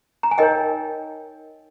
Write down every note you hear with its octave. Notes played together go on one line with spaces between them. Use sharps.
A#5
G#5
D#4 A#4 C#5 D#5 G5